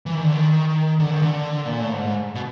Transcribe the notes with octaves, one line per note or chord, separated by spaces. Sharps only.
E3
D#3
D3
D#3
D3
D#3
D3
A#2
A2
G#2
B2